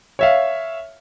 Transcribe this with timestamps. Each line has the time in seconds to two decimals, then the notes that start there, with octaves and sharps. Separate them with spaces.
0.19 C#5 E5 F5